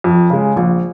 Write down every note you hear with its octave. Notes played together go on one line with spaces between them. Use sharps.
F2
C#3 G#3
A#1